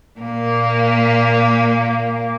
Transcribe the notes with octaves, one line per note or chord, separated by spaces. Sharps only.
A#2 A#3